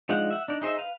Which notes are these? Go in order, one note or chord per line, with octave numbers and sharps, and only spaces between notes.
F3 G#3 D4 D#4 F#5
E5 F#5
D4 D#4 D5
D#4 G#4 C5 D#5 E5
B4 F5